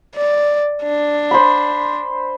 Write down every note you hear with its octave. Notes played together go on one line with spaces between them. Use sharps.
D5
D4
C5 B5